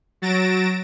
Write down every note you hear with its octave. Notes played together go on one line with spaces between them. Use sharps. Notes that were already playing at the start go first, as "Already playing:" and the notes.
F#3 A6 A#6 D7 E7